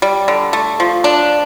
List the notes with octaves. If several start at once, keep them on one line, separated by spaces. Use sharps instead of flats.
G3
D3
A3
F3
D4